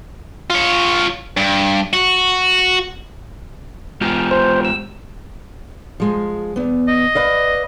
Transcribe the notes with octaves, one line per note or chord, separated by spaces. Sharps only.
F4 C#5
G2
F#4
G#3 F4 G4
C5
E6
F3 G#3
E2 B3
D#5
B4 D5 F5